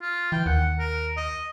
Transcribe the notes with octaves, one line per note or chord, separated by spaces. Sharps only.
F4
E3 G5
D#2 F#5
A#4
D#5